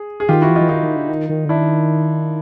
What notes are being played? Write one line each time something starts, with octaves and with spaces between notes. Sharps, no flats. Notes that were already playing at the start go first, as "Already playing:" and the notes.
Already playing: G#4
G#4
D#3 F4 G4
E4 F#4
E3
D#4 F4
E3
D#3 D#4 F4
D#3
D3
D#3
D#3
D3
D#3 D4 E4